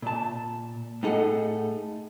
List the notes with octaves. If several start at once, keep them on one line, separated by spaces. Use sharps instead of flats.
A#2 A5
A2 D#4 G#4 A4 F#5